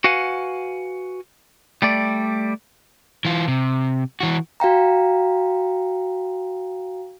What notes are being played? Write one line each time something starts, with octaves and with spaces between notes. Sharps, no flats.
F#4 B4 F5 F#5 G#5
G3 A3 D5
E3 F4
C3
E3 F#4
F#4 F5 G5 A#5